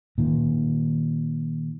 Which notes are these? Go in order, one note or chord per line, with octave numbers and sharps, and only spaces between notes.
A#2 D#3